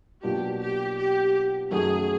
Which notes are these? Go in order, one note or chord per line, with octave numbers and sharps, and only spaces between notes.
B2 F#3 A#3 D4 F4 G4
G4
G4
F#2 D#3 F#3 A3 G#4